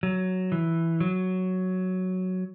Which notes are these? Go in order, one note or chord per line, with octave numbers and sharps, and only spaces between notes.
F#3
E3
F#3